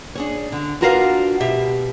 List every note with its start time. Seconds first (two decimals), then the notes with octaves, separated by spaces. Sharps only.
0.15 D4 G#4 C#5
0.52 D3
0.81 D4 F4 F#4 A#4 B4 F5
1.40 B2 G4 E5